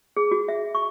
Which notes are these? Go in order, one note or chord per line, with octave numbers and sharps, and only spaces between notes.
G#4
F#4
E5
C#6